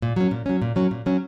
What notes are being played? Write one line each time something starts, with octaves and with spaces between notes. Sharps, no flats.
A#2
F#3 C#4
A#2
F#3 C#4
A#2
F#3 C#4
A#2
F#3 C#4